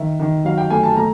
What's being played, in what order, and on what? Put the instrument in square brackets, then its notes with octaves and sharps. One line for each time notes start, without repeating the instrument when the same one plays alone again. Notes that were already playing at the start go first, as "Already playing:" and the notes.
Already playing: [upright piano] D#3 E5
D#3
F#3 F5
G5
A3 G#5
A5
A3 A#5